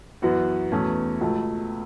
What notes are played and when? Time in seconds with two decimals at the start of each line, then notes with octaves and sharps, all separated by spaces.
0.22 F#2 E3 B3 F#4 B4
0.72 E2 B2 A3 C#4
1.21 C#2 B2 A3